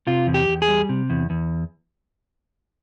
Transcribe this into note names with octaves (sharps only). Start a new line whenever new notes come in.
C3 F4
E2
G4
E2
G#4
G3
C3
E2
E2